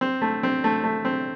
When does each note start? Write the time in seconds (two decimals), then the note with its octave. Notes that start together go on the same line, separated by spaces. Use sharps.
0.01 C4
0.22 A3
0.43 C4
0.64 A3
0.84 A3
1.05 C4